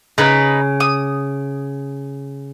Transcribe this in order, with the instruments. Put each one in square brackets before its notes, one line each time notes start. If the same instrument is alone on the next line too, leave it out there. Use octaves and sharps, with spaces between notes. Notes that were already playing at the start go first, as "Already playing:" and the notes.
[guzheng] C#3 [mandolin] D#4 B4
[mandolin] D#6